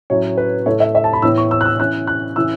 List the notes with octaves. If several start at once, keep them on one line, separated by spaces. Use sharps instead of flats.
A2 F#3 C#4 E4 C#5
B4
A2 A3 E4 C#5
E5
E5
A5
B5
A2 E3 B3 E4 E6
C#6
E6
F#6
E6
E3 C#4 E4 F#6
F#6
A2 E3 C#4 E4 E6